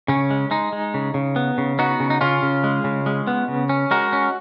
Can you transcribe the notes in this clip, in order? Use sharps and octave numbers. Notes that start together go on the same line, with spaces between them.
C#3 C#4
G#3
G#3 D#4
G#3
C#3
C#3
B3
C#3
B3 D#4 F#4
C#3
D#4
C#3 C#4 F4
C#3
G#3
C#3
G#3
B3
C#3
C#4
G#3 F#4 A#4
C#4